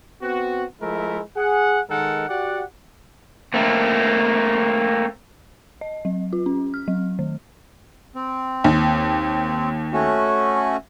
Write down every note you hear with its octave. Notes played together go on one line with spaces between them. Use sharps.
B3 C4 F#4
F3 G#3 A3 E4 A#4
G#4 F#5
D#3 G#3 A4 A#4 F#5
F#4 G4 D5 F#5
A3 A#3 C4
D#5
F#3
F4
C#4
F6
F#3
D#3
C4
D#2
A3 C#4 F#4